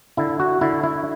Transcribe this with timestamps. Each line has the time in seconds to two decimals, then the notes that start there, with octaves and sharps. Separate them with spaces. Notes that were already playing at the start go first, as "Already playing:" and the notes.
0.17 D3 E4
0.40 F#4
0.61 D3 E4
0.84 E4